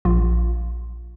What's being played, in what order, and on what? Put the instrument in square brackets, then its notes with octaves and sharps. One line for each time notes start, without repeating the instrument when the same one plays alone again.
[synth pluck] A#1 F4